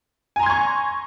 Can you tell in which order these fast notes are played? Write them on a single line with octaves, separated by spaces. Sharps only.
G#5 A#5 C6 G#6 C#6